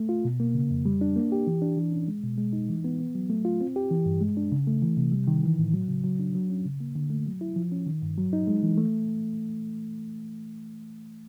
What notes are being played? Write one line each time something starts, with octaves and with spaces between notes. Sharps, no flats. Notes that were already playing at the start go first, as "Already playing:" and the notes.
Already playing: A3
F4
B2
A#3
C#3
F2
G3
D4
A#3
G4
E3
D4
E3
C#4
G#3
B2
G#3
D#4
E3
B3
B3
F#3
A3
F4
C4
G4
E3
G2
G#3
D4
C#3
A3
E3
C3
G3
D#3
E3
A2
F#3
C#3
F#3
D4
F#3
C#4
C#3
A#3
D3
A3
F#3
E4
F3
C#4
D#3
G2
F#3
D#4
G#3
E3
A3